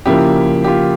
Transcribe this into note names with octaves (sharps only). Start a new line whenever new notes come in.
C#3 F3 A#3 E4 G4
G4
F4